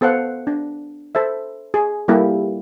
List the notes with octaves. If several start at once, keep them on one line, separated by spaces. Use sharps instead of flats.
B3 A4 C5 F5 F#5
D4
A4 C5 E5
G#4
G3 A#3 E4 G4 A4